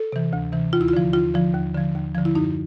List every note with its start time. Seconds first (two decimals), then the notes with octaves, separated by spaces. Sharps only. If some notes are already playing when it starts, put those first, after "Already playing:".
Already playing: A4
0.12 C3 E3
0.33 D2
0.52 C3 E3
0.73 D#2 F4
0.81 E4
0.88 F4
0.93 D3 F3
1.13 D#2 F4
1.34 D3 F3
1.54 D#2
1.75 D3 F3
1.95 D#2
2.15 D3 F3
2.25 E4
2.35 F#2 D#4